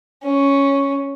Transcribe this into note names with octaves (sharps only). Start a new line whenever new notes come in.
C#4